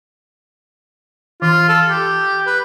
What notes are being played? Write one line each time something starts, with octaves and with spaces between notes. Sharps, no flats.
E3 F4 C6
A4
G4
B4